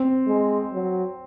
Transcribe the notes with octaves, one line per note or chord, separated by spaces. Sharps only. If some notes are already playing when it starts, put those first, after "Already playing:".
Already playing: C4
G#3
F#3